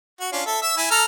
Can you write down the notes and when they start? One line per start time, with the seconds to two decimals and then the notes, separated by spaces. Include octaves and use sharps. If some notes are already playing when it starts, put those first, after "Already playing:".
0.20 F#4
0.33 C#4 D4 F4
0.46 A4 E5
0.62 E5 E6
0.77 E4 G#5
0.91 A4 A#5 F6